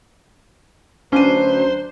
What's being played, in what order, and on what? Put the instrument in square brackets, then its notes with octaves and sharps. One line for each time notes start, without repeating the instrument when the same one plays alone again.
[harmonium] D2 F#3 B4 [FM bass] C#4 [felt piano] D4 D#7 [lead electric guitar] C5